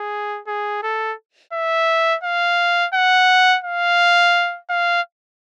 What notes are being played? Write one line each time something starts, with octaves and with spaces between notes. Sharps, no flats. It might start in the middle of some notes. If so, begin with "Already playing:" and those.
Already playing: G#4
G#4
A4
E5
F5
F#5
F5
F5